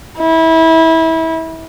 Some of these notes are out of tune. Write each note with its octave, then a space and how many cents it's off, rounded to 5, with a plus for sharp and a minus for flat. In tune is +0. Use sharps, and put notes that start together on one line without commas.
E4 -25